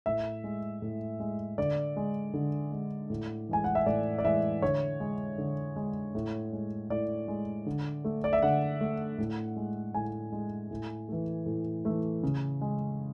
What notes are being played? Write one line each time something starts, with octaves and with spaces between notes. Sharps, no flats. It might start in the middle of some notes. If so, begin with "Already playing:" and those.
A2 E5
G#3
A2
G#3
D3 D5
G#3
D3
G#3
A2
E3 G#3 G#5
F#5
E5
A2 D5
D5
E3 G#3 E5
D3 C#5
G#3
D3
G#3
A2
G#3
A2 D5
G#3
D3
A3
D5
E5
D3 F#5
A3
A2
G#3
A2 G#5
G#3
A2
E3 A3
A2
E3 A3
C#3
G#3